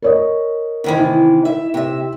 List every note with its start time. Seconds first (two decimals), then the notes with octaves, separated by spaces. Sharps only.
0.02 A#4 C#5 D#5
0.84 C3 D#3 E3
0.98 D#4 E4
1.45 E5
1.74 C3 E5